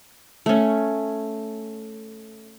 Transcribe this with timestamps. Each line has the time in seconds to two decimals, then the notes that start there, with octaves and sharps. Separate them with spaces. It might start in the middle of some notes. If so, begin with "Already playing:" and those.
0.46 A3 C#4